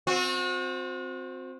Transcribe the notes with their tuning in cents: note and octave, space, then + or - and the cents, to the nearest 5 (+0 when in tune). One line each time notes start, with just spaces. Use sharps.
C4 +0 F#4 -40